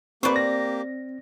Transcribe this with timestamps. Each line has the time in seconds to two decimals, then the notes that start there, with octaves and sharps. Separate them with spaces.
0.23 A#3 C4 G4 B4 C5 D5 C#6
0.36 A#6